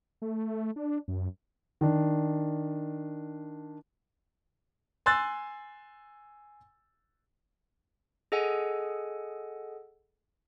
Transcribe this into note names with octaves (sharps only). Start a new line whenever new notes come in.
A3
D4
F#2
D#3 D4
G#5 C6 E6 F#6 A6
G#4 A4 D#5 F#5 G#5